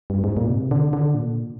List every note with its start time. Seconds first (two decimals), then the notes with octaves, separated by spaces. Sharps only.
0.10 G2
0.24 G#2
0.37 A#2
0.50 C3
0.71 D3
0.93 D3
1.15 A#2